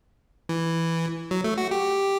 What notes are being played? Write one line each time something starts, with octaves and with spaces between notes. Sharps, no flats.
E3
F#3
A3
F#4
G4